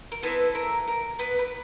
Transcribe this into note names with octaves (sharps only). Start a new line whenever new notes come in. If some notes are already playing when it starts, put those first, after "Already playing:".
A#4
B3 C4 E4 A4 B4
A#4
A#4
B3 B4
B4